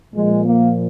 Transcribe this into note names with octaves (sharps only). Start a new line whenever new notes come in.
A#2 F3 G#3
A#3